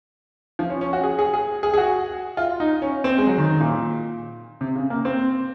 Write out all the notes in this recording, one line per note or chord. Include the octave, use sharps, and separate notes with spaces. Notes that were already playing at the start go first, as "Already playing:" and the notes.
F3
C#4
C#4
F#4
G#4
G#4
G#4
G#4
G#4
F#4
F4
D#4
C#4
C4
G#3
F#3
D#3
D#3
A#2
C3
C#3
A#3
C4